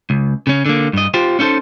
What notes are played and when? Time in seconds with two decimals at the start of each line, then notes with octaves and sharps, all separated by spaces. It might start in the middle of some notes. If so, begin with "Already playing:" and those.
0.10 C#2
0.47 C#3 C#4
0.66 D3 A#3
0.93 G2 D#5
1.14 F4 G4 C5
1.39 C#4 D#4 E4 A4 C5